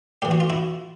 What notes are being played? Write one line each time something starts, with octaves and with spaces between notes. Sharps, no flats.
A2 E3 G4
F#4
F4
E4 F#4